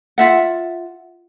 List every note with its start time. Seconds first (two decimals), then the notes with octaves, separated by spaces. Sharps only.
0.18 F4 E5 F#5